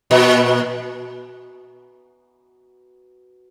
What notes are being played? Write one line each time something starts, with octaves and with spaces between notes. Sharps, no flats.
A#2